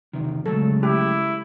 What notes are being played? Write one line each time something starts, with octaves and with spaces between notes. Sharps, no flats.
E2 C3 D#3
C#3 F#3 G#3 A3 A4
E4 G4